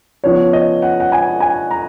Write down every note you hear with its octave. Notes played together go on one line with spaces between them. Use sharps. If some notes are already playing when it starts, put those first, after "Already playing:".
C#3 F3 B3 C#5
D#5
F#5
F#5
G#5
G#5
A#5